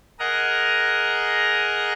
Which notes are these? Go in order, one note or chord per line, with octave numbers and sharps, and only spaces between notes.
G#4 A#4 D#5 F#5 A#5